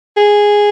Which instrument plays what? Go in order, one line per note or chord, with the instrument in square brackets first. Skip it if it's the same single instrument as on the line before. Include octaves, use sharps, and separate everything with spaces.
[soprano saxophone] G#4